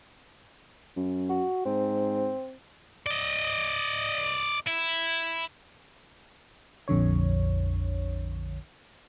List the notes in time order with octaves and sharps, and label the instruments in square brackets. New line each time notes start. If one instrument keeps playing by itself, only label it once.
[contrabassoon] F#2
[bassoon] F#4
[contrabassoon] G#2 [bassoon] C4
[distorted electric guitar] D5 D#5
E4
[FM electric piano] A#1 F2 D3 C#5